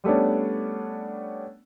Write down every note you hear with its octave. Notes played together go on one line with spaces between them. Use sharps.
G3 A3 B3 C#4 D4